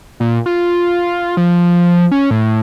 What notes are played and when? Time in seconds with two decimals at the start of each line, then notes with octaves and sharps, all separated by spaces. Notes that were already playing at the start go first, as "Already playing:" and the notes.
0.20 A#2
0.46 F4
1.37 F3
2.11 C#4
2.31 A2